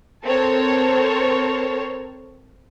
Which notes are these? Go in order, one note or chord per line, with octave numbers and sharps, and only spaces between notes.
C4 A4 A#4 C#5 A5